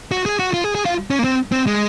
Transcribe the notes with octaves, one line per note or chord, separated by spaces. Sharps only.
F#4
G#4
F#4
F4
G#4
G#4
F4
C#4
A#3
C4
C4
G#3